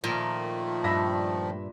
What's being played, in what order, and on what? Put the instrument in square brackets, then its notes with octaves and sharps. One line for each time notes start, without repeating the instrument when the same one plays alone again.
[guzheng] A#2 [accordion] D#3 F3 A3 [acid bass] A#4
[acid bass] G2 [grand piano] E5 B5 A#6